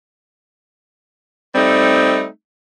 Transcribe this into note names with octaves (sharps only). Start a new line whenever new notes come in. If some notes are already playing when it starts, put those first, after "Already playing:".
G3 A3 C4 D#4